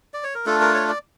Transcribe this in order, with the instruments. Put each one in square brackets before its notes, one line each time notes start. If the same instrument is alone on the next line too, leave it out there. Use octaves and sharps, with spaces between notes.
[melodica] D5
C#5
A#4
A3 D4 F4 A4
A#4
C#5
D5